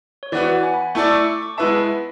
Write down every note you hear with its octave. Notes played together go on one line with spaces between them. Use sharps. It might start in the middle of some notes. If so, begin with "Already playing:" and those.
C#5
E3 B3 F#4 B4 D5
F#5
G#5
B5
B5
A3 E4 A4 D5 C#6
E6
D6
C#6
G#3 B3 E4 B4 E5 A5
B5
B5